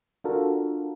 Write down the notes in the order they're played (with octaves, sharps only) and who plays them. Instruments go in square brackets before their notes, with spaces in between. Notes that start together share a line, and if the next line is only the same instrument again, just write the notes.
[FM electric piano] D4 F4 F#4 A4 A#4